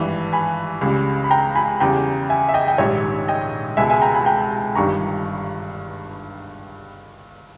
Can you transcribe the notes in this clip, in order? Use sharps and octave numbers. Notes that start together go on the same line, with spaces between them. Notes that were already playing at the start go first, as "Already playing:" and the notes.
Already playing: G#1 G2 E3 G3 B5
G#5 B5
C#2 C#3 G3
B5
G5 A#5
G#5 B5
E2 C#3 G3 G5 A#5
E5 G#5
E5
D#5 G5
G5
A#1 G#2 D#3 G3 C#5 E5
D#5 G5
C#2 B2 G#3 E5 G#5
E5 G#5
G5 A#5
G#5 B5
G5 A#5
G1 G2 D#3 G3 A#5 C#6